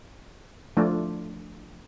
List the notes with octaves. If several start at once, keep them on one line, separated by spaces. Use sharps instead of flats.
F3 A3 D4 F4